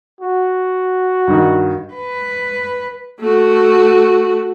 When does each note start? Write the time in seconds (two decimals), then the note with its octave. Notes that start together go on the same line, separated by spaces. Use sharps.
0.21 F#4
1.28 G2 D#3
1.94 B4
3.20 A3 F#4